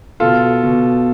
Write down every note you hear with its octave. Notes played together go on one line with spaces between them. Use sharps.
B2 F4 A4
B2